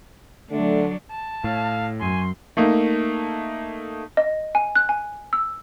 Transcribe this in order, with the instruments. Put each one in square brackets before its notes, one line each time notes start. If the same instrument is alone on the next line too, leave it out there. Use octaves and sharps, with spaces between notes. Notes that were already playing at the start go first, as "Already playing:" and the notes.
[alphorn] D3 [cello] F#3 D4 [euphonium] A3
[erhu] A5
[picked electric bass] A2 [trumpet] F5
[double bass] F#2 [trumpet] G#5 [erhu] C6
[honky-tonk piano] A3 A#3 D#4
[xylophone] D#5
G#5
F#6
G#5
E6